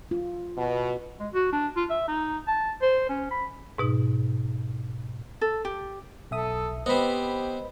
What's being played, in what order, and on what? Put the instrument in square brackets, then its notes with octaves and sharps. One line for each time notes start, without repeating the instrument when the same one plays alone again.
[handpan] F4
[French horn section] B2
[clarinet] G#3
F#4
D4
F4
E5
D#4
A5
C5
C#4
B5
[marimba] G#2 B2 D#4
[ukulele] A4
G4
[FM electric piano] B1 E5 D#6 [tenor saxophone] A4
[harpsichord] B3 C4 [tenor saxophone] G4 [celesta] B4 C5 [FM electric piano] D#5 B5